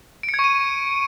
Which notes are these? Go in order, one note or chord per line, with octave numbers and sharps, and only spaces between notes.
D7
C#7
G#6
C#6
D#7